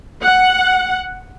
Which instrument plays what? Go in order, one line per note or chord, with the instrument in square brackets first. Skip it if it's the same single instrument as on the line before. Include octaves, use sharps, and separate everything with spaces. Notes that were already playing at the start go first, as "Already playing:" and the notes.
[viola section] F#5